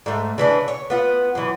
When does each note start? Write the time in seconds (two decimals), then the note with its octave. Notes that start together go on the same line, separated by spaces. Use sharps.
0.06 G#2 A3
0.38 C#3 E3 D4
0.68 C#5
0.90 B3 F4
1.35 F#2 E3